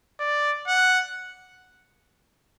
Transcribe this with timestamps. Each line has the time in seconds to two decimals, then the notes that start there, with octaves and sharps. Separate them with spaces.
0.20 D5
0.68 F#5